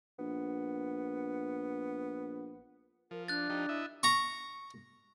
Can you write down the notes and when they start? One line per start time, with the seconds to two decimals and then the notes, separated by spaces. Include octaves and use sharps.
0.19 A#1 B3
3.11 F3 A#4
3.28 D4 F#6 A6
3.49 F3 D#4 G4
3.69 E4 D#5 E5
4.03 A#5 C#6